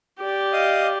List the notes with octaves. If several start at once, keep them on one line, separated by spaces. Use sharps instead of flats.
G4 D5
D#5 F5 D#6